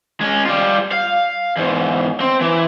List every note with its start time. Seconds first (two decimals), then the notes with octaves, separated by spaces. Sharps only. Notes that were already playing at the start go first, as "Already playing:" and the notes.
0.21 G#3 C#4
0.45 G3 F4
0.92 F5
1.56 E2 G#2
2.20 C4
2.41 E3